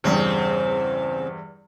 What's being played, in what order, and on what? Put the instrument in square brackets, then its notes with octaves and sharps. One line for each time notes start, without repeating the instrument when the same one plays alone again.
[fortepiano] E2 G2 [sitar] C#3 C4